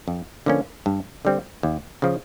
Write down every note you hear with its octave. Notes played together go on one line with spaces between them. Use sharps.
F2
D3 F3 A#3 C#4
G2
D3 G3 C4
D#2
C#3 F3